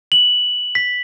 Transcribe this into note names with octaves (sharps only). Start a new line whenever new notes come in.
F#7
B6